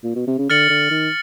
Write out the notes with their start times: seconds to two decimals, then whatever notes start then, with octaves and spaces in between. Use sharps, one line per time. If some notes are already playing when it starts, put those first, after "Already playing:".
0.04 A#2
0.16 B2
0.27 C3
0.39 C#3
0.50 D3 F6 A6 C#7 F#7
0.70 D3
0.91 D#3